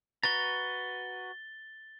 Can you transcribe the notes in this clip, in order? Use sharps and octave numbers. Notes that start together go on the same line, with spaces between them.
F#4 B4 A#5 A6 G7